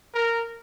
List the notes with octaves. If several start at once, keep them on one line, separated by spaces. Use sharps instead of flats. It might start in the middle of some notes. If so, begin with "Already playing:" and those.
A#4